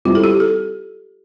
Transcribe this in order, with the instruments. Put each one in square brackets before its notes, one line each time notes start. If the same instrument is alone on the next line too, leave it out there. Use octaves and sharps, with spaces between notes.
[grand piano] G3 C4 E4 [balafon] F4
[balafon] A4
G4
A4